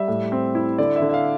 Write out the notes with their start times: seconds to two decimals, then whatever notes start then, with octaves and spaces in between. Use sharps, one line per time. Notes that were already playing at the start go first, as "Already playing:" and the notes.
Already playing: G3 E5
0.08 A2
0.32 C4
0.55 E4
0.78 D3 D5
0.96 E5
1.02 D3
1.09 E5
1.14 F5